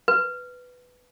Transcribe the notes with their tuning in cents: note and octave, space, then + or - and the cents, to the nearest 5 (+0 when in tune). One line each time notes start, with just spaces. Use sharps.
B4 +5